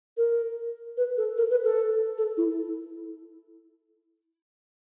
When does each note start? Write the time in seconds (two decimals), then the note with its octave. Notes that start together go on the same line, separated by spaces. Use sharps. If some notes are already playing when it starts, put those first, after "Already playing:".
0.17 A#4
0.97 B4
1.17 A4
1.37 A#4
1.51 B4
1.64 A4
2.18 A4
2.37 E4